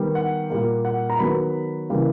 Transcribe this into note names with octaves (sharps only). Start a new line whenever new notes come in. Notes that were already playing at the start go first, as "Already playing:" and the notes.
Already playing: D#3 G3 B3
F#5
A#2 G3 A#3
F#5
A#5
D#3 F#3 B3 B5
C#3 E3 G3 A#3